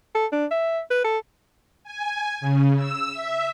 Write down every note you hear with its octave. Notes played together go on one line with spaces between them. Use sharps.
A4
D4
E5
B4
A4
G#5
C#3
E6
E5